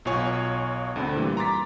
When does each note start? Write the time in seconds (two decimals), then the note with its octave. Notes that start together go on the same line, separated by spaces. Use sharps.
0.05 B1 B2 F4 C#5 G#5
0.96 D2 D3 C4 B5
1.16 A#2 E3 G3
1.37 A#5 C6 D6 A6 B6